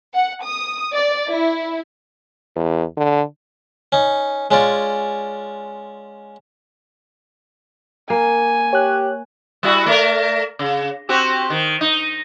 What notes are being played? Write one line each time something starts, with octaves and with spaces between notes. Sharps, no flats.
F#5
D#6
D5
E4
E2
D3
C#4 D#4
G#3 C#4 F4 D5
A#3 G#5
G4 C#5 F#6
G3 E4 F#4
A3 A#4 D5
C#3
C4 F#4 G4
D#3
D#4